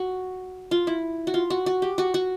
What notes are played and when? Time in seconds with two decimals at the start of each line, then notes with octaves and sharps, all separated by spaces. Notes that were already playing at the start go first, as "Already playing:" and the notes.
Already playing: F#4
0.71 F4
0.87 E4
1.27 F#4
1.34 F4
1.50 F#4
1.66 F#4
1.82 G4
1.98 F#4
2.14 F#4